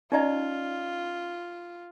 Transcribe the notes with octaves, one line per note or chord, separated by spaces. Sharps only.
C#4 D#4 F4 D5 D#5 A#5